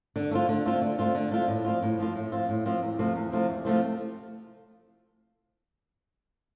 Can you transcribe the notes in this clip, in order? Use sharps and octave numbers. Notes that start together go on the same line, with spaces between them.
D3
A3 C4 F4
D3
A3 C4 F4
D3
A3 C4 F4
D3
A3 C4 F4
A2
F3 C4 F4
A2
F3 C4 F4
A2
F3 C4 F4
A2
F3 C4 F4
E2
C3 F3 A3 C4
E2
C3 F3 A3 C4
E2
C3 F3 A3 C4